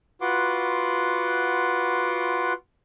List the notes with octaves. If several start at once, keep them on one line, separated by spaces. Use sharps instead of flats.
F4 F#4 B4 F#5 C6 D6